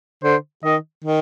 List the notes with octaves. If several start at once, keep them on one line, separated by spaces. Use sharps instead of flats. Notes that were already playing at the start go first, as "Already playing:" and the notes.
D3 C5
D#3 D#5
D#3